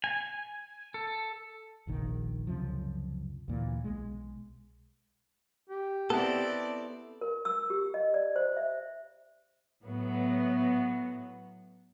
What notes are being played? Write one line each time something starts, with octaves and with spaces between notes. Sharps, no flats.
G#5
A4
F1 A#1 D#3
C#2 F#2 C3 F3
D2 A#2 E3
B1 G#3
G4
B3 C4 E4 A4 D5
A#4
E6
G4
D#5
D5
C5
E5
A2 F#3 B3